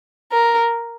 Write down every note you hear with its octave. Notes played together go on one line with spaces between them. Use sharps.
A#4